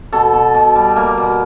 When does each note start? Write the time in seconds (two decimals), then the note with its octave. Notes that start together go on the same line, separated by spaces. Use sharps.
0.13 B2 A4
0.34 B2
0.55 B2
0.76 G3
0.96 A#3
1.18 B2